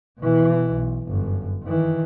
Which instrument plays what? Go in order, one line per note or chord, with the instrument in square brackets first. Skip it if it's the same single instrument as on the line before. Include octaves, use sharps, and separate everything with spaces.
[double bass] B2 E3
B1
G1 F#2
D#3 E3